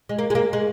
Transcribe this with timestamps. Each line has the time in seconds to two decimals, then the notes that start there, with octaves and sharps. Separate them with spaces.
0.09 G#3
0.19 A#3
0.30 G#3
0.35 A#3
0.53 G#3